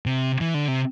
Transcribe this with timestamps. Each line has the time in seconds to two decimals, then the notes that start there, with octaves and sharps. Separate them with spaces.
0.06 C3
0.41 E3
0.54 D3
0.68 C3